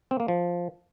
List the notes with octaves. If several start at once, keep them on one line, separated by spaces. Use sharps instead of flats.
C4
A#3
F3